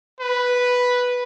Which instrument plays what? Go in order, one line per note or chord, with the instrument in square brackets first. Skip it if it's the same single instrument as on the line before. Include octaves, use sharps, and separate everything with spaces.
[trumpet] B4